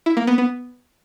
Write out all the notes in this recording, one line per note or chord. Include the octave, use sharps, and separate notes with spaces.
E4
A#3
B3
B3